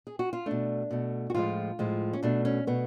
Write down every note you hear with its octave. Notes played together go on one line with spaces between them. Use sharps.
G#4
F#4
F4
B2 A3 D4
B2 A3
F#4
A2 F3 G#3 F4
A2 F3 G#3
C#4
B2 A3 D4
C#4
B2 A3 B3